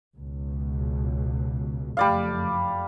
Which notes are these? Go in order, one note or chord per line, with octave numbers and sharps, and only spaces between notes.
C#2 B2
F#1 F2 G3 A3 D5 F5